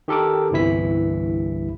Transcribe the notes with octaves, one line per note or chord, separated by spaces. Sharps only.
D#3 G4 A4 A#4 D6
G1 C2 E3 E4 B6